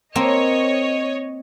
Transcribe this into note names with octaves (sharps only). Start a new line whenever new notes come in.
A#3 C4 C#5 D#5